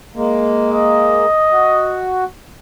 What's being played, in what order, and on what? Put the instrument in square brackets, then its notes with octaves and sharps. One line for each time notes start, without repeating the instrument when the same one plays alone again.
[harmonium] G#3 A#3
[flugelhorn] D#5
[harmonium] F#4